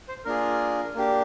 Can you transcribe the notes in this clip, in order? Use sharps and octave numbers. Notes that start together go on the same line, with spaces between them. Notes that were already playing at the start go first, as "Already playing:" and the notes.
C5
A#3 D4 F4 G#4 A#4
A#3 D4 G4